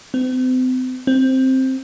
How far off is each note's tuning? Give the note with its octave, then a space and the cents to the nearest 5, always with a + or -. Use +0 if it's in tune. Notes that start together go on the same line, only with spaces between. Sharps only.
C4 -40
C4 +5